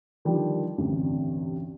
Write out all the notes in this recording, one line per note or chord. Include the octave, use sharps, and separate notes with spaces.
D3 D#3 F3 G3 G4
A1 D2 G2 C3